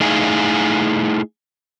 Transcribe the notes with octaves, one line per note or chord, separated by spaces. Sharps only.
A3 D#4 E4 G#4 F5 G#5